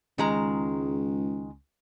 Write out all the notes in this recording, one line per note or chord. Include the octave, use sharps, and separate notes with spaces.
C#2 D#3 G#3 A#5